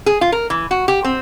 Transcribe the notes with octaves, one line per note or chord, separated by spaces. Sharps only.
G#4
F4
A#4
E3
F#4
G4
C4